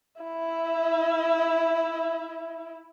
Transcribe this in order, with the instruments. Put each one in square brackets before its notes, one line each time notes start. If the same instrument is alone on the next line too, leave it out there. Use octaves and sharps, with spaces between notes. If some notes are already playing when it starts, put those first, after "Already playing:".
[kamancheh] E4 E5